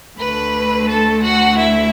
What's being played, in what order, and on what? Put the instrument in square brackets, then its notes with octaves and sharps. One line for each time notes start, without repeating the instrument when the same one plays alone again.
[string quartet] D2 D3 A3 B4 B5
A4 A5
F#4 F#5
E4 E5